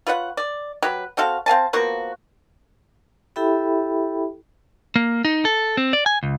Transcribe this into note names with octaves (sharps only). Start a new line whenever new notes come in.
F4 B4 C#5 F#5
D5
F#3 G4 B4
C4 F#4 A4 F5
C4 F5 G#5 A5
F3 A#3 B3 F#4
E4 G4 A4 E5 G5 B5
A#3
D#4
A4
C4
D5
G#5
C#2